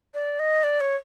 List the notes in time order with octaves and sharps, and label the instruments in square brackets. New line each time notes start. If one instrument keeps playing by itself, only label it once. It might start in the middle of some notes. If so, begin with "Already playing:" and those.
[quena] D5
D#5
D5
C#5